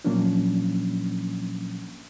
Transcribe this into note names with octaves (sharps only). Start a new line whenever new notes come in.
A#2 F3 F#3 A#3 C#4 D4